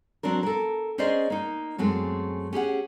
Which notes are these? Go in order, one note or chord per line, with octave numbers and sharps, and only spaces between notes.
F#3 C4 D4 A#4
A4 A#4
C#4 G#4 A#4 C5 D5 D#5
A#3 D#4
F#2 G#3 A3 C4
C#4 G4 G#4 F#5